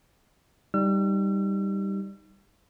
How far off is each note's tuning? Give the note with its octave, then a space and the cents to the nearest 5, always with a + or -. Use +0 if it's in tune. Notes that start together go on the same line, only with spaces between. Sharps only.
G3 +0 D#4 +0 E6 +45